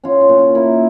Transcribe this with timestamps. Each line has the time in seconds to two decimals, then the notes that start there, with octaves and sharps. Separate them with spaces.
0.04 C#4 F4
0.21 F4
0.29 A#2
0.39 F4
0.55 A#3 E4